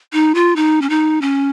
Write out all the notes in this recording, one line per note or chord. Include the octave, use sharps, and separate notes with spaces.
D#4
F4
D#4
C#4
D#4
C#4